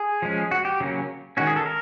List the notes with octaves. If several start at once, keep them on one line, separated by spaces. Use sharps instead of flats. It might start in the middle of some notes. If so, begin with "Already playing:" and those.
Already playing: G#4
F3 G#3 C#4
F#4
G4
C#3 F#3 A#3 C#4
D#3 G#3 C#4 F#4
G#4
A4
A#4